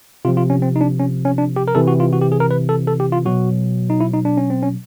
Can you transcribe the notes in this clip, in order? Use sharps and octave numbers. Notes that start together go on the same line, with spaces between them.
C3 F3 F4
F4
C#4
C4
D#4
D4
C#4
C#4
D4
G4
A#4
C3 E3 A4
F#4
F4
F#4
G4
G#4
A#4
B4
A4
A4
G4
F4
B2 F#3 F#4
D#4
E4
D#4
D4
C#4
C4
C#4